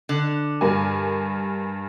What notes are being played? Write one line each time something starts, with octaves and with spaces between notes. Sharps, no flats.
D3
G2 A#4 G#5